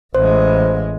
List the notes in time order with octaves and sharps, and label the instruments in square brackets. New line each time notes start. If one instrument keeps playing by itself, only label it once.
[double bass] A1 G#3 [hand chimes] C5